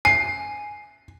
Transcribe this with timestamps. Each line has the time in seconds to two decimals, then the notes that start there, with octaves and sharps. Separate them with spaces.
0.05 G#5 C7